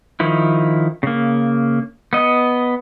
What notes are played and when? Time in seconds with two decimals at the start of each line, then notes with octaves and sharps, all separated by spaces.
0.20 D#3 F3 E4
1.03 C#3 A#3
2.13 B3 D#5